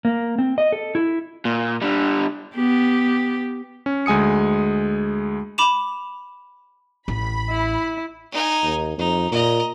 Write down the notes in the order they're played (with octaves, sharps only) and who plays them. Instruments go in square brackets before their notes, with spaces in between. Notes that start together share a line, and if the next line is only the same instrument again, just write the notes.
[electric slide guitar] A#3
C4
D#5
A4
E4
[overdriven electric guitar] A#2
D3 G3
[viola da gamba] B3 G4
[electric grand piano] C#4
D2 G#3 G#5 D#6 C#7
[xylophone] B5 D6 E7 F7
[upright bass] A1 [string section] B5
[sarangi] E4
[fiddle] D#4 G#5
[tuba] D#2
[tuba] F2 [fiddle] D#4
[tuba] A#2 [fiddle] D#5 A#5